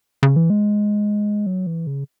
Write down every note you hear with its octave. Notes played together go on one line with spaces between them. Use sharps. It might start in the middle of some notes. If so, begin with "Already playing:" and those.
C#3
E3
G#3
F#3
E3
C#3